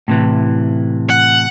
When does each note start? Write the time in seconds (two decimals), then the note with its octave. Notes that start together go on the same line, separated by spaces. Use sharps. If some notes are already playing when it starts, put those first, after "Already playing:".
0.08 A2 C3 E3
1.10 F#5